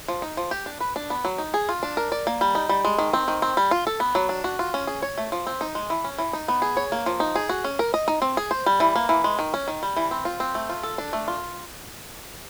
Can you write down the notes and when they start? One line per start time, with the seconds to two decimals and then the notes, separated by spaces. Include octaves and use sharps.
0.08 F3
0.22 D#4
0.37 F3
0.51 G4
0.66 D4
0.80 B4
0.96 D4
1.10 B3
1.25 F#3
1.38 D#4
1.54 G#4
1.69 F4
1.83 D4
1.97 A#4
2.12 D5
2.27 A#3
2.41 G3
2.55 D#4
2.69 G3
2.85 G#3
2.98 D#3
3.13 C4
3.28 D#3
3.42 C4
3.57 G3
3.71 F4
3.87 A4
4.00 B3
4.15 F#3
4.29 D4
4.44 F#4
4.59 F4
4.74 C#4
4.87 G#4
5.02 C#5
5.18 A3
5.32 F3
5.47 C4
5.61 D#4
5.75 G#3
5.90 E3
6.04 C#4
6.18 E3
6.33 D#4
6.48 B3
6.62 G#4
6.77 C#5
6.92 A#3
7.06 F3
7.20 D#4
7.35 G#4
7.49 F#4
7.64 C#4
7.79 A#4
7.94 D#5
8.08 D#4
8.22 C4
8.37 G#4
8.51 C5
8.66 G3
8.80 E3
8.96 A#3
9.09 E3
9.24 G#3
9.39 D#3
9.54 C#4
9.68 D#3
9.83 G3
9.97 E3
10.11 C4
10.25 F4
10.40 C4
10.55 A3
10.69 F4
10.83 A4
10.98 D4
11.13 A3
11.28 F4